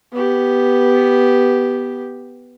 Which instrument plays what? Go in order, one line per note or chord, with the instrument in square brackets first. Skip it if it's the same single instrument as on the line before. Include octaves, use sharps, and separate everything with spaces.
[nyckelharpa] B3 G4